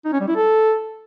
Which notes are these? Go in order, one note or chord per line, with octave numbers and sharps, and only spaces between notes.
D#4
C#4
G3
E4
A4